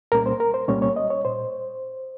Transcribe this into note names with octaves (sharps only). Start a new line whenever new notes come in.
C2 A#2 G3 A#3 C#4 A#4
C5
A#4
C5
C2 A#2 G3 A#3 C#4 C#5
C#5
D#5
C#5
A#2 C5